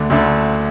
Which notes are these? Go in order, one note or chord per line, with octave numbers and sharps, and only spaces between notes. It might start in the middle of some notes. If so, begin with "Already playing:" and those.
Already playing: D2 D3 A3 D4
D2 D3 A3 D4